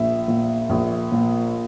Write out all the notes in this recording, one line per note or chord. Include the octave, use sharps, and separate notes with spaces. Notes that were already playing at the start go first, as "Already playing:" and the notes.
Already playing: A#1 E5
A#2
A#1
A#2